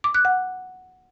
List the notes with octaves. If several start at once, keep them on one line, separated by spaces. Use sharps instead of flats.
D6
F#6
F#5